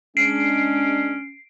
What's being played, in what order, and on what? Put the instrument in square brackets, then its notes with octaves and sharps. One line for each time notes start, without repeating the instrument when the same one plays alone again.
[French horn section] G#3 D4 [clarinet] C#4 [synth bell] C7 D7